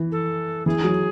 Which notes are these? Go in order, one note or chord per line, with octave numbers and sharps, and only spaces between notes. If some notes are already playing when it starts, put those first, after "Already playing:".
Already playing: E3
A4
E3 G#4
F#3